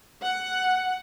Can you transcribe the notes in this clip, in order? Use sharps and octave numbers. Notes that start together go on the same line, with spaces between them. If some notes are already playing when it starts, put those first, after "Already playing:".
F#5